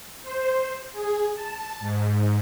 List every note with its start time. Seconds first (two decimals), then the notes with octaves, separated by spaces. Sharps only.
0.23 C5
0.92 G#4
1.34 A5
1.80 G#2